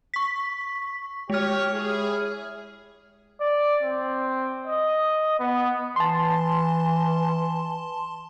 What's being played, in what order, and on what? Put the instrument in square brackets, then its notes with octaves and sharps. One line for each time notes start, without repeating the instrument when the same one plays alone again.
[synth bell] C#6 B6
[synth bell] G#3 F6 [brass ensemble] G4 C#5
[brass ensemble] E4 G#4
[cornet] D5
C4
D#5
B3
[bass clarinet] E3 [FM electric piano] A5 C6